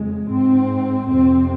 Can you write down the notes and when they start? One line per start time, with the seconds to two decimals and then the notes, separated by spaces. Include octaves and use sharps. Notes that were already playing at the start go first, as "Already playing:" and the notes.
Already playing: F2 C#3 G#3
0.29 G#2 C4
1.08 F2 C3 C4